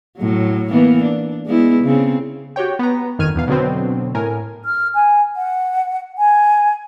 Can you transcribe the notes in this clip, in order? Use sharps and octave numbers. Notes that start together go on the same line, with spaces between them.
A2 F#3
E3 A#3 B3
D4
G#3 B3 E4
C#3 C4
F#4 G4 C#5 G5
B3 A#5
G1 F2 D#3 F6 G#6 D#7
E2 B2 F5
B2 D3 F#3 B3 C4
A2 A#4 G#5
F6
G#5
F#5
G#5